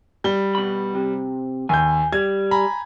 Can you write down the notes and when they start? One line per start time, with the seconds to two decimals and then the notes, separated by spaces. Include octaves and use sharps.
0.24 G3 G7
0.55 B2 B5
0.95 C3
1.69 D#2 G#5 G6
2.13 G3 G#6
2.51 G#5 A#5 B5